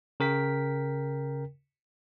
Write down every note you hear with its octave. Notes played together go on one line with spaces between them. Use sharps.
C#3 A#4 G5 B6